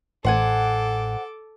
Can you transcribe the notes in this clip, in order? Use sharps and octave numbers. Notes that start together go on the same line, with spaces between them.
A1 A4 C5 F#5 G#5 D6